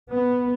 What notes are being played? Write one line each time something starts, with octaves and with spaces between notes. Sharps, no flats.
B3